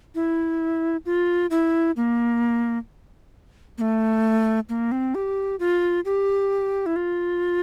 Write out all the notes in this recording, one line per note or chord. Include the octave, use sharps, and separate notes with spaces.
E4
F4
E4
A#3
A#3
A3
A#3
C4
G4
F4
G4
E4
F4